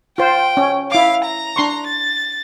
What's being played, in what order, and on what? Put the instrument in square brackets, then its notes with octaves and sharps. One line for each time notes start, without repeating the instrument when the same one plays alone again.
[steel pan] F4 C5 [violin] G5
[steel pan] C#4
[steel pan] E4 D6 [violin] F5
[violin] A#5
[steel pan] D4 C6 C#6
[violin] A6